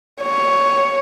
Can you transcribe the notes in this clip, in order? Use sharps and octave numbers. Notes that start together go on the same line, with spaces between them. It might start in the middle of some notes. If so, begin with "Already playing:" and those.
C#5